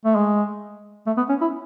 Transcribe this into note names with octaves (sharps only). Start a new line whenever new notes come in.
A3
G#3
A3
B3
C#4
E4